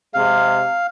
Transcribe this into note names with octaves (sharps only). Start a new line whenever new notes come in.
C3 G#3 F5